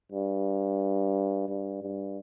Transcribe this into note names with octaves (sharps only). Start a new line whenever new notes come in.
G2
G2
G2